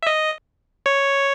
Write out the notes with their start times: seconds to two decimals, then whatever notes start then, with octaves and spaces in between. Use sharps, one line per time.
0.03 E5
0.07 D#5
0.86 C#5